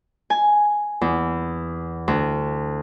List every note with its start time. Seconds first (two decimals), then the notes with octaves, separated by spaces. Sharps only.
0.30 G#5
1.01 E2
2.08 D2